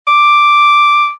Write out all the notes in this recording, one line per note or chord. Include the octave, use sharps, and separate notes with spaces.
D6